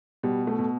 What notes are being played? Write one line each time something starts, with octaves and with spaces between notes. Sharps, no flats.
B2 G3
A3
B2